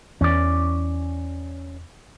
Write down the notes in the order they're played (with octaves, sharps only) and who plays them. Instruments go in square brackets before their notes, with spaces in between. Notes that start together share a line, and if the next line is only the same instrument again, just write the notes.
[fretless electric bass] E2 E3 [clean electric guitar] C#4 D5